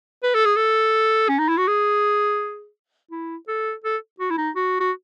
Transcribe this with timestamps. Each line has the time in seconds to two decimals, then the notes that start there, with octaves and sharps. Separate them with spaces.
0.23 B4
0.34 A4
0.46 G#4
0.56 A4
1.29 C#4
1.39 D#4
1.48 E4
1.58 F#4
1.67 G#4
3.11 E4
3.48 A4
3.84 A4
4.20 F#4
4.31 E4
4.38 D#4
4.55 F#4
4.80 F#4